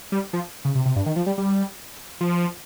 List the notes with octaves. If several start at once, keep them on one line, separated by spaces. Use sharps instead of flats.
G3
F3
C#3
C3
C3
G2
D#3
F3
G3
G3
F3